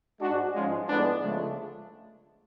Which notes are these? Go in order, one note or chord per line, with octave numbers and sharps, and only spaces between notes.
G#2 G#3 D4 F#4
G#2 F3 G#3 C#4 F4
A2 F3 G#3 B3 D4
C#2 C#3 F3 G#3 A3